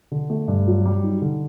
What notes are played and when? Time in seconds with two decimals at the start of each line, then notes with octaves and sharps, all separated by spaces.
0.12 D3
0.30 A3
0.48 G2
0.67 F#3
0.86 G3
1.04 D#4
1.22 D3